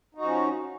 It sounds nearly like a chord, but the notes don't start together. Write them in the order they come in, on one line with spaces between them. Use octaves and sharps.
D#4 F#4 F3 C#4